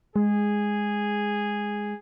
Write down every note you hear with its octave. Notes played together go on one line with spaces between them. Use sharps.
G#3 G#4